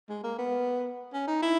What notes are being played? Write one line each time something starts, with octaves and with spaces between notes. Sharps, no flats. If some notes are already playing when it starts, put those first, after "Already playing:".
G#3
A#3
B3
C#4
D#4
E4